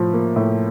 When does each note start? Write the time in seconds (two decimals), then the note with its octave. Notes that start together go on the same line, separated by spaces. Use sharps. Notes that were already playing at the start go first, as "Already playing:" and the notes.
Already playing: A2 F3
0.13 A#3
0.36 A2